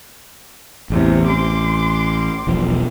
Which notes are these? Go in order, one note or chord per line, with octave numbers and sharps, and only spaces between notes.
A1 E2 C3
C6 D6
E1 B1 F3